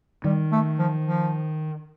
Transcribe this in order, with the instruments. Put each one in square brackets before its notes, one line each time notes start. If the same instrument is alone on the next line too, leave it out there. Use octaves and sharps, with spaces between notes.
[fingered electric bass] D#3 [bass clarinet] G3
[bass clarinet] A3
F3
F3